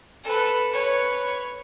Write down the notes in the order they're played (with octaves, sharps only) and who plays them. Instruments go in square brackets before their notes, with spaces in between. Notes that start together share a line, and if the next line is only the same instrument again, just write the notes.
[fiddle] A4 B4
B4 C#5